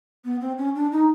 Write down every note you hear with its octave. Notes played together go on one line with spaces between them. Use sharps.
B3
C4
C#4
D4
D#4